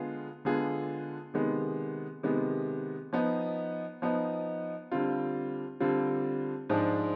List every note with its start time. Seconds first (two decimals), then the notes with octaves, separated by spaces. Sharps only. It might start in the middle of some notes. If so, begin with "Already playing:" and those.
Already playing: D3 G#3 B3 F4 G#4
0.45 D3 G#3 B3 F4 G#4
1.34 C3 D#3 G#3 B3
2.23 C3 D#3 G#3 B3
3.13 F3 B3 D#4
4.02 F3 B3 D#4
4.92 D3 G3 C4 F4
5.80 D3 G3 C4 F4
6.70 G#2 F3 G#3 D4